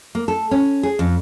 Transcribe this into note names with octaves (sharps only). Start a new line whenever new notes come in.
A#3
A4
C#4
G#4
F2